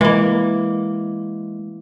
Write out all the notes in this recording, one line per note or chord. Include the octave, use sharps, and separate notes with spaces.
E3 G#3 A#3